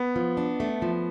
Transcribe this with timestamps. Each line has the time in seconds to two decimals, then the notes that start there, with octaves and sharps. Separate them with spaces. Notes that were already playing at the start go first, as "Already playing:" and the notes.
Already playing: B3
0.16 F3
0.37 D4
0.60 A3
0.82 F3